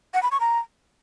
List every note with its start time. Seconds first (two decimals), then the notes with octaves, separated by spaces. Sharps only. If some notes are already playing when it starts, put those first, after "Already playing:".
0.14 F#5
0.23 B5
0.32 C#6
0.40 A#5